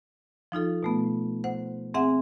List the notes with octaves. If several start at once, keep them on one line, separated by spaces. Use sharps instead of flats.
F3 D#4 F4 A4
B2 A3 B3
C5 F#5
C4 G#4 E5 F#5 G#5